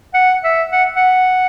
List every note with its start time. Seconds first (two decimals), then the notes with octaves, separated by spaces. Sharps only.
0.14 F#5
0.44 E5
0.72 F#5
0.96 F#5